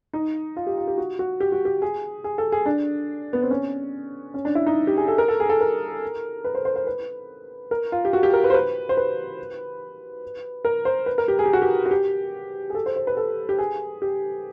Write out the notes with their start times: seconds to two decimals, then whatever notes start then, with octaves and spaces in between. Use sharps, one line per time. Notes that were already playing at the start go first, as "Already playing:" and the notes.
0.13 D#4
0.56 F4
0.67 G4
0.78 F4
0.88 G4
0.98 F#4
1.19 F#4
1.40 G4
1.52 F#4
1.65 G4
1.82 G#4
2.24 G#4
2.38 A4
2.52 G#4
2.66 D4
3.33 B3
3.42 C4
3.51 C#4
4.34 C#4
4.45 D4
4.55 E4
4.66 D#4
4.87 G4
4.97 G#4
5.08 A4
5.18 A#4
5.28 A4
5.40 G#4
5.49 A4
5.61 A#4
6.44 B4
6.55 C5
6.65 C5
6.76 C5
6.87 B4
7.71 A#4
7.92 F4
8.05 G4
8.13 F#4
8.23 G4
8.33 A#4
8.44 B4
8.50 C5
8.54 B4
8.89 C5
8.97 B4
10.65 A#4
10.85 C5
11.06 B4
11.18 A#4
11.28 G4
11.39 G#4
11.46 G4
11.53 F#4
11.62 G4
11.86 F#4
11.91 G4
12.70 G#4
12.75 A4
12.86 C5
12.96 C5
13.07 B4
13.17 A4
13.49 G4
13.59 G#4
14.02 G4